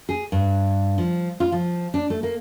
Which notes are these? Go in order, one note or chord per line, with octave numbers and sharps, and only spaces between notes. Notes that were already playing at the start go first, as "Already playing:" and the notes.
G#4
G2
F3
F4
F3
D4
A3
A#3